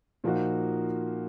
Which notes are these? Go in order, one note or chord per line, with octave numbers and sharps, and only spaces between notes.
A#2 F3 A#3 D#4 F#4